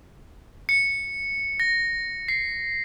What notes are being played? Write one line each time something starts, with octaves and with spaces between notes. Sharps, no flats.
C#7
A#6
C7